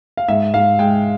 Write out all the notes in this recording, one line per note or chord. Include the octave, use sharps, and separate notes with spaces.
F5
G#2 E5
G#2 F5
G#3 G5